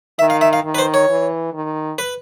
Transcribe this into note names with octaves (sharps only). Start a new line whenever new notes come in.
D#3 E5
F5
E5
F5
D#3
B4
C5
C#5
E3
D#3
B4